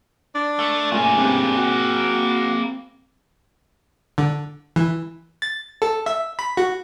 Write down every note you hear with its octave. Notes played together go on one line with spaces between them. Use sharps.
D4
A3
A#2 A3 A#3 C#4 G#4 G#5
G2 C4
F#4
D3
E3
A6
A4
E5
B5
F#4